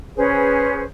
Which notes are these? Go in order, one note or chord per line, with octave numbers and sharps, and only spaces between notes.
C#4 G#4 B4 C5